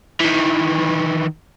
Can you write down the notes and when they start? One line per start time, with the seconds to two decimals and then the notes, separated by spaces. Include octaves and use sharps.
0.21 D#3 E3